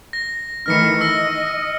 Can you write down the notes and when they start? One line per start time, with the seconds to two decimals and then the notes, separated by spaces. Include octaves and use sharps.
0.13 A#6
0.66 D#3 E3 A3 F6 A#6 C#7
1.01 D#5 E6 A#6 C#7